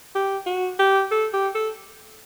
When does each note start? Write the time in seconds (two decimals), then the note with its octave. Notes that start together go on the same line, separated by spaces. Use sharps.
0.15 G4
0.46 F#4
0.79 G4
1.11 A4
1.33 G4
1.55 A4